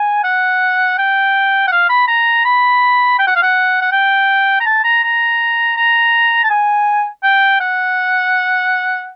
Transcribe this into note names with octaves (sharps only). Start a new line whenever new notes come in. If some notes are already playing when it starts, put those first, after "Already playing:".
Already playing: G#5
F#5
G5
F#5
F5
B5
A#5
B5
G5
F#5
F5
F#5
F#5
G5
A#5
A5
A#5
A#5
A#5
A5
G#5
G5
F#5